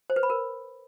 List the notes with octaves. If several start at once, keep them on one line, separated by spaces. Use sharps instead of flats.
C5
B4
B5
A#4